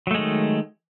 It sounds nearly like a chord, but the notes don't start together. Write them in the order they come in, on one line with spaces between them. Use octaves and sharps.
F#3 A3 G#3 D#3